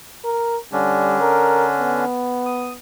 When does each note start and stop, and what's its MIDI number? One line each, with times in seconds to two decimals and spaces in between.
0.25 0.57 70
0.72 2.05 50
0.72 1.18 55
0.72 2.05 61
0.72 2.05 62
1.21 1.66 70
1.80 2.78 59
2.46 2.73 87